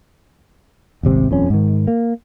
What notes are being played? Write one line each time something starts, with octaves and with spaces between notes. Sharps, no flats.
D#1 G#1 C3
D#1 F2 C#4
G#2 D#3
A#3